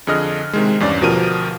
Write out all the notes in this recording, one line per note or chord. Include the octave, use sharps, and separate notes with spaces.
F2 D3 G#4 D#5 F6
C3 D#3 G#3
E2 G2 C#4 D5
D2 B2 F3 G4 A#4 D#7